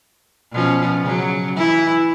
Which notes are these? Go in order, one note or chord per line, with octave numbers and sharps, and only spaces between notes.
B2 F3 C#4
C#3 F#3
E3 E4